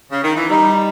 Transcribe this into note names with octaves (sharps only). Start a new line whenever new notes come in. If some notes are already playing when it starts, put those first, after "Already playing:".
C#3
D#3
E3
G3 D#4